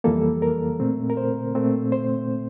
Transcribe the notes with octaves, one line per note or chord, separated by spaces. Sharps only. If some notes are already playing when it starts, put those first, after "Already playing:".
F2 E3 G3 A#3 A4
A#4
A#2 A3 C4
A#4
C5
A#2 A3 C4
C5